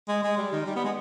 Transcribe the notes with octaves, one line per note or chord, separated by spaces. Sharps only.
G#3
G#3
G3
D#3
G3
B3
G#3